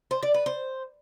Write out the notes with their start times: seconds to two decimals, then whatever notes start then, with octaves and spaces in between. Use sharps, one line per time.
0.11 C5
0.23 D5
0.34 B4
0.46 C5